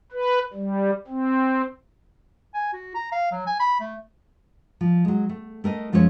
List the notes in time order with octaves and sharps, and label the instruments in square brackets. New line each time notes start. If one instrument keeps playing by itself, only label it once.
[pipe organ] B4
G3
C4
[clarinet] G#5
F#4
A#5
F5
F#3
G#5
B5
A3
[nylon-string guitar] F3
F#3 G#3
A3
A3 A#4 D5 D#5
F#2 F3 G#3 C#4 C#5